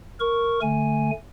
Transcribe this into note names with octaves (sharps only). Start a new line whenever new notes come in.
A#4 C#6
D3 A3 G#5